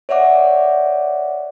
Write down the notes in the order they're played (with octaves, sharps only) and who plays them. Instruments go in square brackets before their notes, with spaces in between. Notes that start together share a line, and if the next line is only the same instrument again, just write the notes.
[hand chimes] C#5 D5 E5 F#5 D6